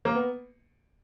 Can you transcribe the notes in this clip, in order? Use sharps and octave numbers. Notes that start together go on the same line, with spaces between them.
A#3
B3